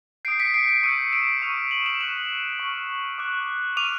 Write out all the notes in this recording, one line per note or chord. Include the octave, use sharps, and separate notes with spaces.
D#6 G6 C7 D7
B6 C#7
C7 D7
C7 D7
C#6 E6 G6 C#7 D#7
D7 E7
C#6 F6 D#7 F7
E7 F#7
E7 F#7
C#6 F#6 E7 F#7
C#6 F6
D6 F#6
D6 F6 D#7 F7